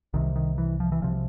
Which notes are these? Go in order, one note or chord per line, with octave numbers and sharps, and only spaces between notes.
C2 C3 D#3
D#3
E3
F3
E3
C2 C3 F3